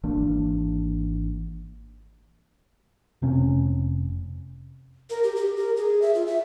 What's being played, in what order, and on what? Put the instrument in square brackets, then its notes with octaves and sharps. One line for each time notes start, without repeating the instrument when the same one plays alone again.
[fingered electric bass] G#1 E3 A#3 D4
[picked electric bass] F1 C3 C#4
[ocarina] A#4
G4
G4
A#4
G#4
E5
F4
E5